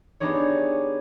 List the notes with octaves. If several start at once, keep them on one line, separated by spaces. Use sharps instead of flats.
B3 D4 D#4 G4 G#4 C#5